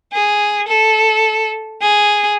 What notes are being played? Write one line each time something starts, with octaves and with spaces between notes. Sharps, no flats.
G#4
A4
G#4